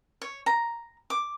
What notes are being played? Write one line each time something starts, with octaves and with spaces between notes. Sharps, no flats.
C#5
A#5
D6